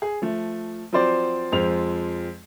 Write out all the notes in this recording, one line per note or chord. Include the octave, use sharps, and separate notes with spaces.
G#4
F3 A3
F3 F#3 C4 C5 D5
F2 F3 G#3 C4 C5 F7